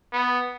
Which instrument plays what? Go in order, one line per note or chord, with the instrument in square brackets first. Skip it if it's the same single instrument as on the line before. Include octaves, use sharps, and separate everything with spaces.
[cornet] B3